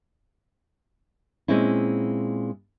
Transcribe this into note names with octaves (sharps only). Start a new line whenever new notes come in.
A#2 G#3 C4 C#4 E4